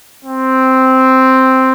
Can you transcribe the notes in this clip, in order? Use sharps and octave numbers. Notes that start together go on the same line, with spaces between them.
C4